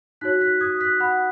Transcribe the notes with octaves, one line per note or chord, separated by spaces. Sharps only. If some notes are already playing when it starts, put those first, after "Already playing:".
D#4 F#4 C#5 F#6 B6
F#6 B6
D#6 G#6
F#6 B6
F#5 B5